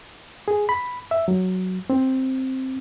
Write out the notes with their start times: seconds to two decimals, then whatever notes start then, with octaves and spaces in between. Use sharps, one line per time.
0.48 G#4
0.69 B5
1.11 E5
1.28 F#3
1.90 C4